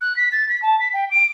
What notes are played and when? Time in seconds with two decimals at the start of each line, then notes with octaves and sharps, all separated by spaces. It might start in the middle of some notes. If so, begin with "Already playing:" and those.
0.01 F#6
0.16 B6
0.32 A6
0.49 B6
0.62 A5
0.80 B6
0.94 G5
1.11 D7